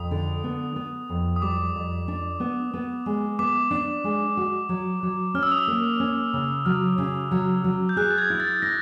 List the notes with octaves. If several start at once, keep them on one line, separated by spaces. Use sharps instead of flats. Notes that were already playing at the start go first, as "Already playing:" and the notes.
Already playing: F2 D#6
D3
B3
B3
F2
D#6
G3 D6
F2
D4
B3
B3
G#3
B3 D6
D4
G#3
F#4
F#3
F#3
C#4 F6
E6
D#6
E6
A#3
C#4
C#3
F#3 F6
C#3
F#3
F#3
G6
G#4 F#6
A6
G#6
E4
A6
E4 A#6